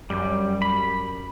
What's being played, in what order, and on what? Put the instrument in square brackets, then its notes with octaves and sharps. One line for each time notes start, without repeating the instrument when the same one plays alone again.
[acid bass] F#2 [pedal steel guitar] G3
[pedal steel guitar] B5